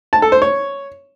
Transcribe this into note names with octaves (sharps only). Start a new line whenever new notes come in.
A5
A4
C5
C#5